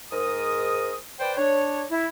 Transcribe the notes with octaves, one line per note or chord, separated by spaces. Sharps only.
G#2 A#4 D#6
B4 C5 D5 G5
D4 C#5
E4